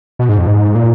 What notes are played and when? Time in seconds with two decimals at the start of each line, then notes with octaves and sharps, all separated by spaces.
0.19 B2
0.29 G#2
0.38 F2
0.47 G#2
0.75 A#2